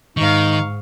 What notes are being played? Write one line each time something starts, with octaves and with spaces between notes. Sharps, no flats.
G#2 D#3 D#4 F5 C#6